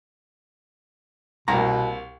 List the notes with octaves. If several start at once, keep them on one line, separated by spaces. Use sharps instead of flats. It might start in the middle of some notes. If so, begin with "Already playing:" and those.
C2 B2 A#3 A#5